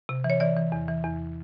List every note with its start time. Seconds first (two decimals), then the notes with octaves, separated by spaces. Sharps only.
0.09 C3
0.24 E3
0.30 C#5
0.40 E3 D5
0.57 E3
0.72 E2
0.88 E3
1.04 E2